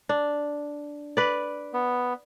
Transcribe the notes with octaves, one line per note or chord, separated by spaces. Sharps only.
D4
B4 D5
B3